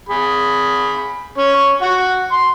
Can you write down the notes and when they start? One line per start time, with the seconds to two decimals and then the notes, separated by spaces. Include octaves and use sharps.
0.09 G#4 B5
1.38 C#4 C#5
1.82 F#4 F#5
2.32 C6